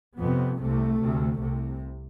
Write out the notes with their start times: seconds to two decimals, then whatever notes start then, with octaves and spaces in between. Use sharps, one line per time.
0.19 F2 C3 B3
0.59 C2 C3 A3
1.00 D2 C3
1.40 C2 C3